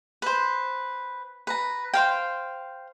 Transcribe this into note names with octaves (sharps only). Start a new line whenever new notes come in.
B4 C5
B4 A#5
C5 F5 G5